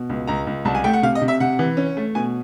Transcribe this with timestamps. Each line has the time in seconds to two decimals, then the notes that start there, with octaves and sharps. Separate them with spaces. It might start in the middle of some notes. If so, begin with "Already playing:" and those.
Already playing: B2
0.10 C#2
0.27 C#2 A#5
0.47 C#2
0.65 C2 A5
0.75 G#5
0.84 A3 G5
0.93 F#5
1.03 C3 F5
1.15 D#5
1.21 C3
1.28 E5
1.40 C3 F#5
1.59 E3
1.77 C#4
1.97 A3
2.15 B2 G#5